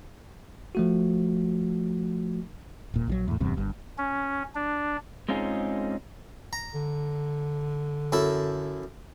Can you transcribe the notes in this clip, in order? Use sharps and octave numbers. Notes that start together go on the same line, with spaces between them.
F3 A3 F#4
D#1 A#2
A#1 D#3 F#3
E2 A2
D#1 E2 G2 C3
G1 G2
C#4
D4
G#3 C4 C#4 D#4 F4 G#4
A#5
D3
F#2 E4 A4